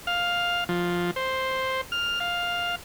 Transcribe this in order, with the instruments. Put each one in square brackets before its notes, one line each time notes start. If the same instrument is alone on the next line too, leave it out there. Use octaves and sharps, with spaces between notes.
[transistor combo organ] F5
F3
C5
F6
F5